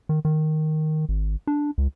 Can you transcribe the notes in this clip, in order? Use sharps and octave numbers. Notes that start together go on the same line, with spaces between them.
D#3
D#3
G#1
D4
C#2